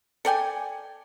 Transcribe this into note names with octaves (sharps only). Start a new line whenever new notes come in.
A4 D5 G5 G#5